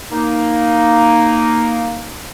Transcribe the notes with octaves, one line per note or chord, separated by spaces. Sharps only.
A#3 D#4